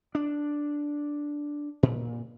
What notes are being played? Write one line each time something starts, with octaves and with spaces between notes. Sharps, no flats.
D4
A#2